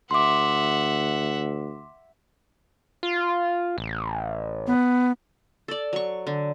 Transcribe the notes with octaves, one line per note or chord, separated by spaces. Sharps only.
D2 E5 F#5 C6 D6
F4
A1
B3
A4 D5
F#3 C#6
D3